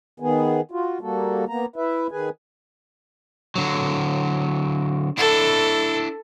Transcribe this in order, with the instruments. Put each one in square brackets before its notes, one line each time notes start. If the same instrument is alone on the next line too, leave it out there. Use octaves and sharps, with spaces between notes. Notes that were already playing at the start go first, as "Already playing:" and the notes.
[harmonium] D#3 B3 G#4
F4 F#4
G3 A#3 F#4 A4
A#3 B3 A#5
E4 B4 E5
D#3 G#4 B4 G#5
[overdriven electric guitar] D3 F#3
[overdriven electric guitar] D4 E4 [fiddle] A4